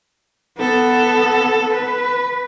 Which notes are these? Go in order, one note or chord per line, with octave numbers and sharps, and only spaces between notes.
B3 A4
B4